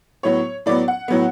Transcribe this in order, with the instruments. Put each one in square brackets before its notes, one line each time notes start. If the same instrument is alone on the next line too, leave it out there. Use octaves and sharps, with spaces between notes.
[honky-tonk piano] A2 F#3 B3 C#5
A2 F#3 B3 D5
F#5
A2 F#3 B3